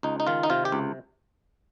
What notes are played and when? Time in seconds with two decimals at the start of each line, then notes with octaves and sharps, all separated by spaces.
0.03 C#2 D#4
0.20 D#4
0.27 D#3 F4
0.43 D#4
0.50 C3 F4
0.65 G4
0.72 C#2